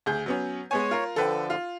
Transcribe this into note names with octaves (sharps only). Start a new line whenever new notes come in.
D2 G#4 G6
F#3 B3 C#4
G#3 B3 C#5 G#5
F4 A#4
D3 F3 A4 B4 G5
F4